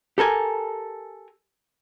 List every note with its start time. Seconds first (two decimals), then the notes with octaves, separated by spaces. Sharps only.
0.18 G4 A4 A#4 G#5